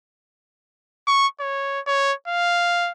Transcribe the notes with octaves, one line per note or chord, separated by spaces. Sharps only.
C#6
C#5
C#5
F5